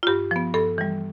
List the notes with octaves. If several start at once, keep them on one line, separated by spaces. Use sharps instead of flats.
F4
G2 G4
F3 B3
G2 A4
E3 G3